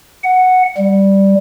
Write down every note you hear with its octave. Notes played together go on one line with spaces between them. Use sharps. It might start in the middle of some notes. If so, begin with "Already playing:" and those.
F#5
G3